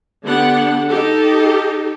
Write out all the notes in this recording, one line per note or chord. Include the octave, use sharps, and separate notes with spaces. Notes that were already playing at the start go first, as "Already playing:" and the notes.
D3 B3 D4 G4 F#5
D#4 G4 A4